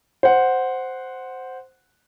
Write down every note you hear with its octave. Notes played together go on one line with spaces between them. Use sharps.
C5 F#5